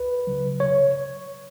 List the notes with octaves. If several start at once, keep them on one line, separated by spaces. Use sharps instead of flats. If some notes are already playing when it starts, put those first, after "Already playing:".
Already playing: C#2 B4
C#3 F#3
C#5